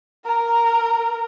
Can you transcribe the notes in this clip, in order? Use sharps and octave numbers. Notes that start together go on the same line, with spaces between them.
A#4 A#5